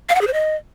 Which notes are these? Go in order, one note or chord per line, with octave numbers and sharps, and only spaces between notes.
F5
F#5
G#4
C5
D#5